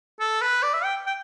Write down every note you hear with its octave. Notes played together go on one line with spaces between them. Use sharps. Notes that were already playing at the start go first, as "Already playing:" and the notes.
A4
B4
D5
E5
G5
G5